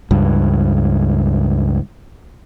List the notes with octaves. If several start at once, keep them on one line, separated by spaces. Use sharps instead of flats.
C#2 G2